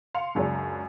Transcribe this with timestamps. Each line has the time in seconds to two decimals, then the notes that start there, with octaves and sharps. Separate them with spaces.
0.14 F5 C6 C#7 F7
0.35 C#2 F#2 D4 G#4 C#5